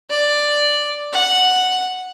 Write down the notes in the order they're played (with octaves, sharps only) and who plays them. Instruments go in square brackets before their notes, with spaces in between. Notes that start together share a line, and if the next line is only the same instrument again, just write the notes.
[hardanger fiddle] D5
F#5